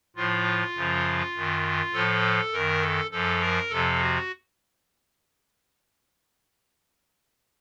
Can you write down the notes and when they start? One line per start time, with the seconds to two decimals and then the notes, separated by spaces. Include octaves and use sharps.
0.16 A2 F3 F4
0.75 F#2 C#3 F3
1.34 F#2 D#3
1.93 A2 F3 A4
2.52 F#2 D#3 A#4
2.82 A4
3.11 F#2 F3 A4
3.41 A#4
3.70 F2 C3 F3 A4
4.00 F#4